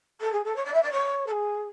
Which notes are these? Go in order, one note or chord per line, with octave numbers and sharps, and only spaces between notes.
A4
G#4
A4
C#5
D5
E5
D5
C#5
A4
G#4